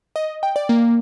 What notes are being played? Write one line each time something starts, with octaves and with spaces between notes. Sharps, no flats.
D#5
G5
D5
A#3